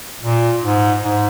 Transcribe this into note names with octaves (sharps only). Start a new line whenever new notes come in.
A#2
G#2
G#2